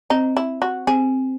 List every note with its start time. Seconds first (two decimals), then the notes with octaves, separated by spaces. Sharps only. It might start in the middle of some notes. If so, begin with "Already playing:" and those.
0.10 C4 D#4
0.37 E4
0.62 F#4
0.87 C4 G#4